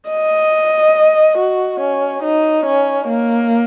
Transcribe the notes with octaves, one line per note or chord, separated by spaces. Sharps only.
D#5
F#4
C#4
D#4
C#4
A#3